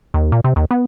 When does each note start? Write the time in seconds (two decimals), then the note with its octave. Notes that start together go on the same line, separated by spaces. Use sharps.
0.14 D#2
0.32 A#2
0.44 C3
0.56 D#2
0.71 B3